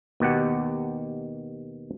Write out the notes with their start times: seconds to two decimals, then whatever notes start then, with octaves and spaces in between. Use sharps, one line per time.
0.20 D#2 B2 G4 F#5